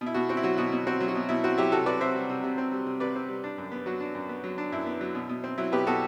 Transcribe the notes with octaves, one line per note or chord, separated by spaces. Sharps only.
B2
E4
B2 F#4
C4 F#4
E4
F#3 F#4
B2 F#4
B2
C4 F#4
F#3
F#4
B2
B2 E4
C4 F#4
F#3 E4 G4
C3 F#4 A4
C3 B4 D5
C4 C5 E5
G3
C3
C3
C4
G3
C3
C3 B4 D5
C4
G3
D4
F#2
B3
F#3 F#4
D4
F#2
B3
F#3
D4
F#2 E4
B3
F#3
B2
B2
C4
F#3 E4
B2 G4 B4
B2 F#4 A4